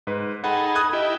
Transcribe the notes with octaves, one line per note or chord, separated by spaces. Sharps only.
G#2 G#3 B4
D#4 G#4 A4 F#5 G5 B5
D#6 F#6 G#6
E4 G4 D#5